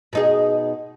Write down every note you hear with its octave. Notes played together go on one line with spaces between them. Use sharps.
B2 D#4 G#4